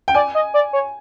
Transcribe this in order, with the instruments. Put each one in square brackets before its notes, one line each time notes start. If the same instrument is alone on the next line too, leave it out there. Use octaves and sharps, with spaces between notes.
[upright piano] G5
[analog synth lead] D5 [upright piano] G#5
[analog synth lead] D#5
D5
C#5